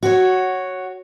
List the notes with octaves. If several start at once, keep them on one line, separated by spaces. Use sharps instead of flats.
F#4 C#5